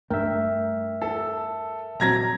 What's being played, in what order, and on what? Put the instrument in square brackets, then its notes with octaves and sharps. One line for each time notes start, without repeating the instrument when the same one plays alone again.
[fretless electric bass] G2 A3 [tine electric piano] A#4 E5 [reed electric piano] G5
[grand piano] A4
[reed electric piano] A#2 F#3 C4 [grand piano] A#5 G#6 A#6